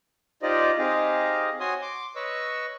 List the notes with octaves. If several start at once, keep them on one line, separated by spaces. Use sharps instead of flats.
D#4 F4 G4 C5 D5 D#5
C4 D#4 G4 G#4 D#5 F5
F#4 C#5 G#5 C6 D#6
C6 D6
B4 C#5 D#5 C#6 E6